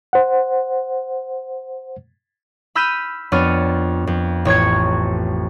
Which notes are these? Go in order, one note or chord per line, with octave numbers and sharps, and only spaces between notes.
C5 F#5
B5 E6 F6 G6 B6 D#7
F2 B3 D4 C#5 F6 D#7
F2
A1 C#5 C#6 G#6